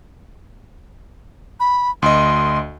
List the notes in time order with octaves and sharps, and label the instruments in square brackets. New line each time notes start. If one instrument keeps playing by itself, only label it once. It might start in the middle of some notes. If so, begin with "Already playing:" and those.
[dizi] B5
[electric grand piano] D2 D#5 [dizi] C6